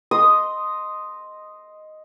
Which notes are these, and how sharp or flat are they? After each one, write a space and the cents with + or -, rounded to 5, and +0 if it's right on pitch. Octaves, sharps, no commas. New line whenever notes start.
D#5 +0 C6 +0 D#6 +0